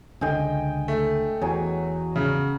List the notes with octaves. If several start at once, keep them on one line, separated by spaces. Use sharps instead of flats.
C#2 D3 D#5 G5 G#5
A3
E2 F#3 G#4
C#3